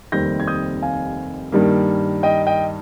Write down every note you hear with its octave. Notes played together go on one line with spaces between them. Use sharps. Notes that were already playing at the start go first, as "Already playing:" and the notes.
F1 D#2 D#3 G3 C4 G6 A#6
G#6
D#6 G6
F5 G#5
G2 D#3 G3 A#3
D#5 G5
D#5 G5